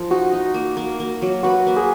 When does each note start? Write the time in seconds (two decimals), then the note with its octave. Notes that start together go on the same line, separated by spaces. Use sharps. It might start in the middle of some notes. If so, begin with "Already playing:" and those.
Already playing: F3 A#4
0.11 D#4 F#4
0.33 D#4
0.54 A#3
0.77 A#3
1.00 A#3
1.22 F#3
1.43 F#4 B4
1.67 A#3
1.77 G#4